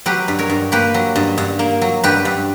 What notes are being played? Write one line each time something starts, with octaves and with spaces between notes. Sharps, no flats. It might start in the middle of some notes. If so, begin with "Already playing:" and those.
F#3 G4 B4
G2
A#4 C#5
G2
A#3 G4 B4
F#3
G2
G2
A#3
F#3
G2 G4 B4
G2